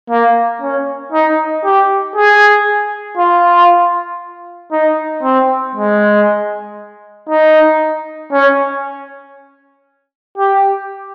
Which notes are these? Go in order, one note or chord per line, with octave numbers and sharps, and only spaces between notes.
A#3
C#4
D#4
G4
G#4
F4
D#4
C4
G#3
D#4
C#4
G4